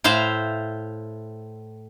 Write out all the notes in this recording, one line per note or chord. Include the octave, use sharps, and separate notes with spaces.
A2 C5 E5 F5